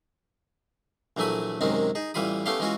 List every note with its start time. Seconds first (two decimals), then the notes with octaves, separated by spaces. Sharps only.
1.17 A#1 E3 F#3 A3 G#5 B5
1.61 F#2 C3 D#3 G#3 C4 C#4
1.95 D#4 G#4
2.14 A1 E3 G3 F4 B5 D#6
2.46 A3 B3 C#4 G4 F5 C6
2.60 E3 G#3 C#4 F4 F#4